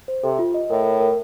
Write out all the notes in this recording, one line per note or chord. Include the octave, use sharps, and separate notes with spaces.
C5
C3 A4
F4
D#5
A2 A#4
A#4
A#4